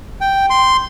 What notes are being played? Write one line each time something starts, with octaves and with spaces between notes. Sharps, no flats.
G5
C6